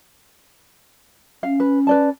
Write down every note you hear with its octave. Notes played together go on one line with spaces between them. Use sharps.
C#4 F5
B4
B4 D5 A5